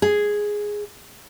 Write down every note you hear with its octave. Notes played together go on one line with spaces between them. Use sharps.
G#4